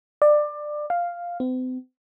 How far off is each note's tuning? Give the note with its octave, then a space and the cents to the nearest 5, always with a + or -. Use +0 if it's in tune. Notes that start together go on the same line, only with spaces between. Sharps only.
D5 +20
F5 +0
C4 -45